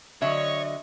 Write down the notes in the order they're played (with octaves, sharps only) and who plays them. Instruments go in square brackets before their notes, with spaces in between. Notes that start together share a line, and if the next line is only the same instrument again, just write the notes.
[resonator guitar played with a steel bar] D3 F#3 [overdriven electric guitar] C#5 [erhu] D#5 [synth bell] E5